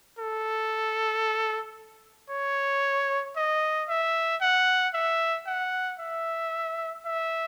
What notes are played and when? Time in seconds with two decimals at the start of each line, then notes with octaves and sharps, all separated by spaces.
0.19 A4
2.30 C#5
3.36 D#5
3.89 E5
4.41 F#5
4.94 E5
5.47 F#5
6.00 E5
7.05 E5